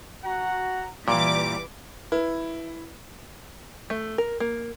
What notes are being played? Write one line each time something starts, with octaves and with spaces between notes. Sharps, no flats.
F#4 F#5 A#5
A#2 E3 G3 D6
E4 B4
A3
A#4
A#3